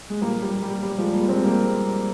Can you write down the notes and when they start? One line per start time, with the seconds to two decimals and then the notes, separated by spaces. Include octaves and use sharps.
0.10 G#3
0.21 A#2 F3 G3 A#3
0.42 G3
0.63 G3
0.83 G3
0.98 F3 G#3
1.13 G3 A#3
1.28 G#3 C4
1.44 G3 A#3